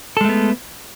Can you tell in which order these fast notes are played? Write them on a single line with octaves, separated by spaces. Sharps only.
A4 G#3 A3 B3